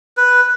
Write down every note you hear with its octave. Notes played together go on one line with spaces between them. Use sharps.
B4